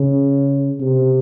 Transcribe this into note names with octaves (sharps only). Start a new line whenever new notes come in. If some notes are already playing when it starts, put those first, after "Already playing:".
Already playing: C#3
C3